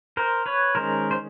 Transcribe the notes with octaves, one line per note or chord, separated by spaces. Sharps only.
A#4 C5
B4 C#5
D#3 G#3 C#4 A#4 C5
C5